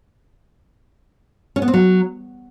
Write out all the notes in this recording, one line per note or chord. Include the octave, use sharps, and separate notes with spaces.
C#4
B3
C4
F#3